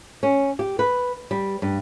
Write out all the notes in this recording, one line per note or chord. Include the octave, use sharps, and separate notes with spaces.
C#4
G4
B4
G3
G2